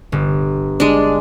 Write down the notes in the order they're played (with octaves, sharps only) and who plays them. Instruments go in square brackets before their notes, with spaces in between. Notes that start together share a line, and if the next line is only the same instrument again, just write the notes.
[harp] G1
[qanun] G#3 D4